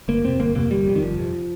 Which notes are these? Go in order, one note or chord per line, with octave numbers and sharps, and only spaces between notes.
G1 A#3
F2 C3 C4
G1 A#3
F2 C3 A#3
G1 G3
F2 C3
D#3
G1 F3
F2 C3